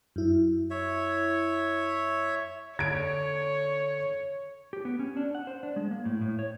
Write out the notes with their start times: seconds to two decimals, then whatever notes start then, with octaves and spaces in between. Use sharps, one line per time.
0.16 F#2 E4
0.71 C#5 E5
2.79 D3 C#5 G#6 D7
4.73 G4
4.85 B3
4.99 C#4
5.17 D4
5.35 F#5
5.47 C5
5.63 D4
5.76 G#3
5.91 A#3
6.05 A2
6.21 A2
6.39 C#5